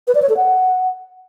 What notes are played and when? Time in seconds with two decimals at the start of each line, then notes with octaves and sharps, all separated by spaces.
0.08 B4
0.15 D5
0.22 C#5
0.29 A4
0.37 F#5